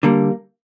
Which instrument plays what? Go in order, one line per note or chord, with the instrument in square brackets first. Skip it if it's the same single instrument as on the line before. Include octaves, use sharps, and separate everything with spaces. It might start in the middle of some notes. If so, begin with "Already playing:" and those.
[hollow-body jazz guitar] D3 G3 A#3